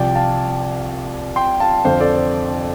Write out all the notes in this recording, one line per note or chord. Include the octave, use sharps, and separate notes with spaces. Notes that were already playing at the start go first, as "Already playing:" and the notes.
Already playing: C2 C3 F3 D5 G5
F5 A5
G5 C6
F5 A5
F2 D3 F3 C5 F5
A4 D5
C5